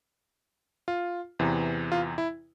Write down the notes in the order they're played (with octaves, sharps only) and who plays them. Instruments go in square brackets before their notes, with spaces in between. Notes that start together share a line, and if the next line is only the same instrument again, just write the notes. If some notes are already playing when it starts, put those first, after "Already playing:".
[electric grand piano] F4
E2 C3 E3
F4
E4